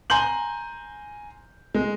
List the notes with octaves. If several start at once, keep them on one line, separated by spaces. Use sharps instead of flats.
G#5 A#5 C6 G6 F#7
G#3